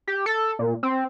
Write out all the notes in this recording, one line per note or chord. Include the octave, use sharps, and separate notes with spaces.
G4
A4
A#2
C4